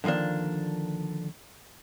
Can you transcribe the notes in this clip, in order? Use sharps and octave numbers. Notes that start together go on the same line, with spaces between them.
D3 D#3 F3 A#3 D4